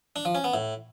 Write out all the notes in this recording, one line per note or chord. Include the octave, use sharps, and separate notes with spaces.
D4
F3
C#4
B3
A2